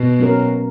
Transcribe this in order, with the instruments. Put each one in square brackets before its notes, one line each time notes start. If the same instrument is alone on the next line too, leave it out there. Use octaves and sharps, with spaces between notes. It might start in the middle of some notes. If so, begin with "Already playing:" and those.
Already playing: [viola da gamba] B2
[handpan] F#3 A#3 C#4 F#4 A#4